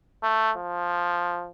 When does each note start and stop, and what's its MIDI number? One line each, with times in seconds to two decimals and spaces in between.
0.23 0.52 57
0.57 1.51 53